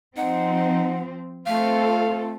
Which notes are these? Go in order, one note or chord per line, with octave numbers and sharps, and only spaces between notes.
F3 C4 D#4 F#5
A3 C4 F4 A4 F5